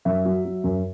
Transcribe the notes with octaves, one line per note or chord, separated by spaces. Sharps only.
F#2 E5
F#3
F#3
F#2